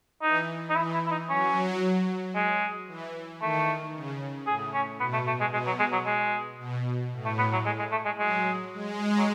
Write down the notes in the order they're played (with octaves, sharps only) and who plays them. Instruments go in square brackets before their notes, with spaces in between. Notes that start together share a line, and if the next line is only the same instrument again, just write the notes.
[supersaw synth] E3 [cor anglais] D#4
[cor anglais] D#4
[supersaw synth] E3 [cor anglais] E4
[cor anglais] E4
E4
D#4
[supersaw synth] F#3 [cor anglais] C#4
[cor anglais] G#3
[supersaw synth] E3
[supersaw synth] D#3 [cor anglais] A3
[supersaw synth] C#3
[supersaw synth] A2 [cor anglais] G#4
[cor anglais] C#4
[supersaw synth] B2 [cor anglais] B3
[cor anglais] A3
A3
G#3
[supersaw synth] B2 [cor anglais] G#3
[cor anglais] F#3
G#3
F#3
G#3
[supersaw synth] B2
A2
[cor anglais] A3
B3
F#3
G#3
G#3
A3
G#3
[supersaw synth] F#3 [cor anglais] G#3
[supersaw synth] G#3
[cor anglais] F#3